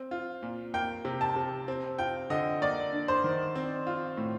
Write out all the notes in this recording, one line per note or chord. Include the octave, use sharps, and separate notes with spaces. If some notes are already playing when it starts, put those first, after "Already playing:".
Already playing: C4
F4
A#2
A#3 G5
C3
A5
C3
C4
F4 G5
D3 D#5
A#3 D5
D4
C5
D#3
C4
F4
A2